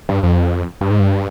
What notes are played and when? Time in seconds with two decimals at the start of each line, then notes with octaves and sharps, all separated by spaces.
0.09 G2
0.23 F2
0.81 G2
0.91 G#2
1.00 G2